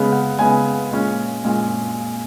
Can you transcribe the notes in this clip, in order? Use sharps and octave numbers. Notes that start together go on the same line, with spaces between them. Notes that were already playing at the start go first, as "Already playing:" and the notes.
Already playing: C#3 G#3 B3
F#5
C#3 G#3 B3 G#5
A#2 G#3 C#4
A#2 G#3 C#4